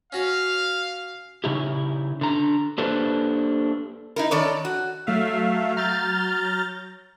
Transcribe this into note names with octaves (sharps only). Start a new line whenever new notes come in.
C#4 F#4 C#5 F5
C#3 D#4 E4 G4
D3 A#5
A#3 D4 G4 A4 B4 C5
D#4 E4 A#4
D#3 A4 C#5 D5
F#4
F#3 A3 E5 F5
F#3 A#5 F6 G6 A6